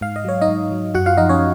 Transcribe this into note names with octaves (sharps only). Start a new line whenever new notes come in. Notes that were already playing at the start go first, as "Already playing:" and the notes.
G#2 F5
D#5
F#3 C#5
D#4 D#5
G#2
F#3
F#2 F#4 F#5
F4 F5
F3 D#4 D#5
C#4 C#5